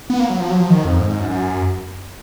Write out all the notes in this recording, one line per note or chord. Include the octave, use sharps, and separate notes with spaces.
B3
A#3
F#3
F3
F#3
F3
D#3
F2
G#2
G#2
F#2
F#2